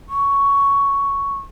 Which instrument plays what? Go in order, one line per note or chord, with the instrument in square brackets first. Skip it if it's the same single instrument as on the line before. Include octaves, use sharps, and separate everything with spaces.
[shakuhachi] C#6